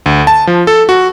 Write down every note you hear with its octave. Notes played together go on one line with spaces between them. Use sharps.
D2
A5
F3
A4
F#4